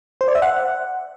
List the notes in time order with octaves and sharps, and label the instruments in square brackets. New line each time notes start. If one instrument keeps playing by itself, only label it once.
[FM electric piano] C5
D5
E5
F#5